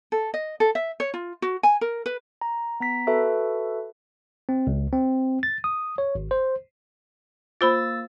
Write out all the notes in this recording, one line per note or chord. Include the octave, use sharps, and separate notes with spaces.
A4
D#5
A4
E5
C#5
F4
F#4
G#5
A#4
B4
A#5
B3 A#5 B6
F#4 A4 B4 E5
C4
C#2
C4
A6
D#6
C#5
G#1
C5
A#3 F4 C5 B5 E6 A6